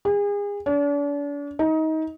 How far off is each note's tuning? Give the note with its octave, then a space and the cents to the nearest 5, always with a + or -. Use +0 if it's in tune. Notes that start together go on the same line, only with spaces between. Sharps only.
G#4 -35
D4 -40
D#4 +25